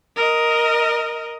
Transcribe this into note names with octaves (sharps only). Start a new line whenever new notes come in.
A#4 D#5